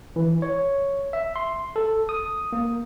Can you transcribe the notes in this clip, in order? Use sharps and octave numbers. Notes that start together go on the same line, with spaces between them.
E3
C#5
E5
C6
A4
D#6
A#3